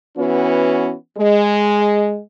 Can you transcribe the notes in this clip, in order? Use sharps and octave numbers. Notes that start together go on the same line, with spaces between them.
E3 B3 C#4 F#4
G#3